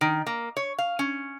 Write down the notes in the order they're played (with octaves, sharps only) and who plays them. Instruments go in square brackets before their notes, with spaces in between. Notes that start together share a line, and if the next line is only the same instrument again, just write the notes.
[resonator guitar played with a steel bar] D#3
A#3
C#5
F5
C#4